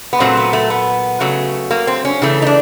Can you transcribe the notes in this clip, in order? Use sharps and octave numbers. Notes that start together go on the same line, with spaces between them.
B3
A#2 F#3 A3 C4
B3
A3
B3
C#3 F#3 A3
A#3
C4
C#4
C#3 E3 A3
D#4
D4